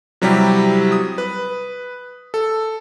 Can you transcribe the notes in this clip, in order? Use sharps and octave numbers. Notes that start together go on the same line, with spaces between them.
C3 F#3 G3 E4 G4
D#6
B4
A4